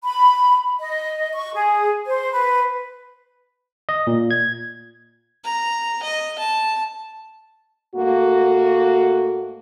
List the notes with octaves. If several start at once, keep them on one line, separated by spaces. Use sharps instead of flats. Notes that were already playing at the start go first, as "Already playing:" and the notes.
B5
D#5
C#6
G#4
C5
B4
D#5
A#2
G#6
A#5
D#5
A5
G#2 A3 A#3 F#4